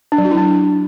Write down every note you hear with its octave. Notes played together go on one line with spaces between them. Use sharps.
D4
F#3
F#4
E4
D4